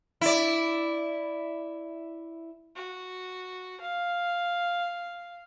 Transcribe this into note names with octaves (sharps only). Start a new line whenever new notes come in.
E4 D5
F#4
F5